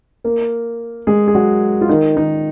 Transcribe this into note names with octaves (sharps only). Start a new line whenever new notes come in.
A#3 A#4
G#3 G#4
G#4
F#3 F#4
F4
D#3 D#4
D#3 D#4